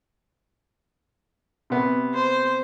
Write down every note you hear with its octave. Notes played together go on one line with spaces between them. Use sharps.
C3 B3
C5